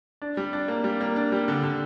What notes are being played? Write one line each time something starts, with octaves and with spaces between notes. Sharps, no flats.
D4
G3
D4
A#3
G3
A#3
D4
G3
D3
D3